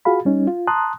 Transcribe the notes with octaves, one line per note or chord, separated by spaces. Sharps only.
F4 F#4 G#4 F5 B5
G3 C#4 D#4
F4
A5 A#5 C6 D#6 F#6